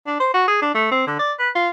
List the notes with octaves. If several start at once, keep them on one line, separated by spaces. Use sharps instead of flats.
D4
C5
F#4
G#4
D4
A3
C4
D3
D5
B4
F4